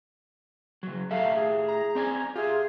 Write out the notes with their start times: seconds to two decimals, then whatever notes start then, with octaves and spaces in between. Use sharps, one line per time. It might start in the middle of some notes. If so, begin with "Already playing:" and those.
0.83 C#3 F#3
1.11 A2 A3 G4 E5 F5
1.34 G#4
1.68 A#5
1.95 C4 D5 G#5
2.36 F4 G4 G#4 E5